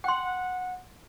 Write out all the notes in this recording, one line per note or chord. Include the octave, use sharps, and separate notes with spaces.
F#5 G5 C6